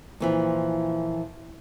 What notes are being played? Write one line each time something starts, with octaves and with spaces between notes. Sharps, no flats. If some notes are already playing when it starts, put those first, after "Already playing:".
A#2 E3 F3